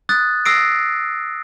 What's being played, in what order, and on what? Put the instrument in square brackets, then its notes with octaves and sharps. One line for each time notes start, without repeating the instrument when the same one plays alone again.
[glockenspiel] D#6 F#6 A6
D#6 E6 A#6 C7 D7